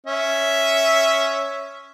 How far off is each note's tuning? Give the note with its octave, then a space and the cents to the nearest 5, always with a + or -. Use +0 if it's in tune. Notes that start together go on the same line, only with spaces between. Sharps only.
C#4 +0 E5 +0